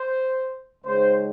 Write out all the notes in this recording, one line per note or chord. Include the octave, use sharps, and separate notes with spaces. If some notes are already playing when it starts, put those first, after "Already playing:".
Already playing: C5
C#2 C#3 G#3 D#4 C5